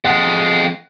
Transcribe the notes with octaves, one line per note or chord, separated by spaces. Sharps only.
F2 G#3 F#5